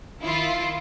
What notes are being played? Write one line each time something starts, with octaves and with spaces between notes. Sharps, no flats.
D#3 E4 F4